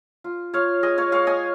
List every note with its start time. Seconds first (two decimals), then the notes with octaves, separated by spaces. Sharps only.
0.24 F4
0.53 F4 C#5 F5
0.83 G#3 D#5 G#5
0.98 C#5 F5
1.12 G#3 C#5 F5
1.27 D#5 G#5